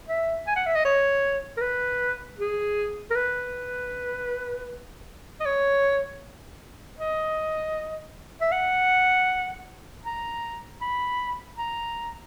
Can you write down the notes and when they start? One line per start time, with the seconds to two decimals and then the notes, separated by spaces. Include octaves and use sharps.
0.08 E5
0.47 G#5
0.56 F#5
0.67 E5
0.75 D#5
0.85 C#5
1.57 A#4
1.61 B4
2.39 G#4
3.10 A#4
3.15 B4
5.40 D#5
5.46 C#5
6.99 D#5
8.41 E5
8.52 F#5
10.05 A#5
10.81 B5
11.58 A#5